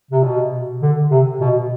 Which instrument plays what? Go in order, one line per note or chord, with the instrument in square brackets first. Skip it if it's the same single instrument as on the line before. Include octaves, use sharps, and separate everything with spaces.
[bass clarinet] C3
B2
D3
C3
B2